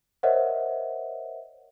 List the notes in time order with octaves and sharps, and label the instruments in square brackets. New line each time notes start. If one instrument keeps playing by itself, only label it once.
[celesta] A#4 C5 C#5 D#5 E5 F#5